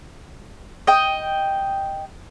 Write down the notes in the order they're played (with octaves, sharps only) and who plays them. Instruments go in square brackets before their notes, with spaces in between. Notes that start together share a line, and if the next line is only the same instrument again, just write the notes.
[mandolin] D#5 G5